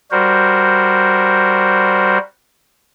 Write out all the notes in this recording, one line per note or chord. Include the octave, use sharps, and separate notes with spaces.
G3 F#4 A#4 C5